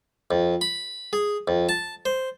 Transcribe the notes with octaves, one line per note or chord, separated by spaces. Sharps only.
F2
B5
G#4
F2
A5
C5